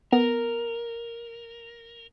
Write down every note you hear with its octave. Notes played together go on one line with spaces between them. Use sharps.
B3 A#4